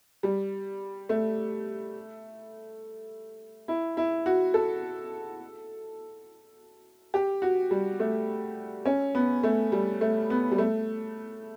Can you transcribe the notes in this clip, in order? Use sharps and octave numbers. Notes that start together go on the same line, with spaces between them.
G3
A3
E4
E4
F#4
A4
G4
F#4
G3
A3
C#4
B3
A3
G3
A3
B3
G3
A3